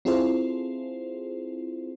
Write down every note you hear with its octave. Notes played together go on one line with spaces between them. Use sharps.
C4 E4 F4 G#4 A4 C5